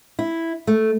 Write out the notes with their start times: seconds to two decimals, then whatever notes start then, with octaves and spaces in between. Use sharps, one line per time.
0.19 E4
0.67 A3